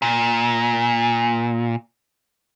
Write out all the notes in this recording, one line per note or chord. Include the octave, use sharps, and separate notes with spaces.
A#2